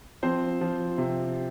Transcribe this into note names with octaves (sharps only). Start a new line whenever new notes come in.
F3 C4 C5
F3
C3